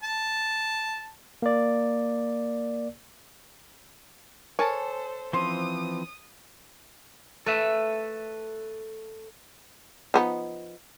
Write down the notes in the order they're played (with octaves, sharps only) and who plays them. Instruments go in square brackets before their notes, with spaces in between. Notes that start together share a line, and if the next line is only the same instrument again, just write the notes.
[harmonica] A5
[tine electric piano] A#3 D5
[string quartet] A4 C5 [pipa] A#4 G#5 A5 [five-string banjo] C#5
[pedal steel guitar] E3 F3 C4 [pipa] C#4 C5 [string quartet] D#6
[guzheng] A3 [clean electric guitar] A4 B4 E5
[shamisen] F3 B3 D#4